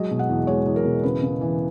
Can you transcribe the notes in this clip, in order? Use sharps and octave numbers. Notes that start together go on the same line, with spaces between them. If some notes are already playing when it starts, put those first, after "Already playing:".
Already playing: F#3 G#3 D#5
B2
F#5
E2
G#3 C#5
E2
A#4
B2
C#3 B4
C#3
E3